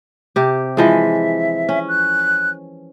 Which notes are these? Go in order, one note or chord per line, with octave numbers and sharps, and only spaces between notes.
C3 G4
E3 F3 G#3 E5
C#4
F#6